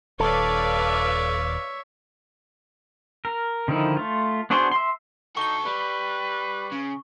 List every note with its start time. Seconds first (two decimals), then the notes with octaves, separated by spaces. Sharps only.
0.20 D#1 D#2 A4 B4 C#5 D5 E5 F5
3.25 A#4
3.68 D3 D#3 F3 D#4 E4
3.97 A3 F4
4.50 B3 D4 F#4 G#4 C5
4.72 E5 C6
5.37 D#4 F#4 A4 C#6 G7
5.65 G3 B4
6.72 C#3